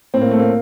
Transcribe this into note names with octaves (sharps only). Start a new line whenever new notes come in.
A2 C4
A#3
A3
A#3